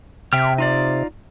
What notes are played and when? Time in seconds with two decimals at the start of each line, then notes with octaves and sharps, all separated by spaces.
0.33 C3 E5 G5 F6
0.58 D#4 F4 D5